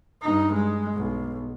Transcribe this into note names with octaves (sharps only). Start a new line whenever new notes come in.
G2 D#4
G#3
B1